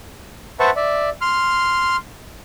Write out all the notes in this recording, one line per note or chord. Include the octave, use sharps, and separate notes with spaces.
B4 C5 E5 F#5 A5 C#6
D5 E5
C6 F6